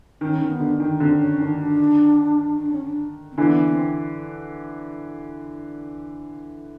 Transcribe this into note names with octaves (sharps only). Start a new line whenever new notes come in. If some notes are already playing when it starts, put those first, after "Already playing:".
D#3 C#4
D#3
B3
D3
D#3
D3 C4
C#4
D#3 D4
D4
D4
C#4
D4
C4
D3 E3 B3
B3
C4